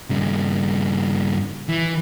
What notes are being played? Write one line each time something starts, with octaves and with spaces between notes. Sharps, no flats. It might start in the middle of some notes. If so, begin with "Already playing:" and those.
G2 C#3
E3